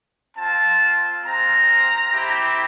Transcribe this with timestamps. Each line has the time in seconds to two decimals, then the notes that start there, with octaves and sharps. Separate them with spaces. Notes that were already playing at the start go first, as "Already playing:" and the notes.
0.37 C4 F4 A5
1.24 G#3 C4 F4 A#5
2.11 C4 E4 G4